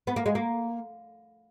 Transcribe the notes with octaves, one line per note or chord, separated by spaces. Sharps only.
B3
A#3
G#3
A#3